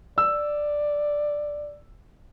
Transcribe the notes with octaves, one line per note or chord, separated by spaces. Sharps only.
D5 E6